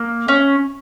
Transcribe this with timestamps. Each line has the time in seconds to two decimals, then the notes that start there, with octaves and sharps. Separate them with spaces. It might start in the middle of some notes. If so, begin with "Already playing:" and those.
Already playing: A#3
0.28 C#4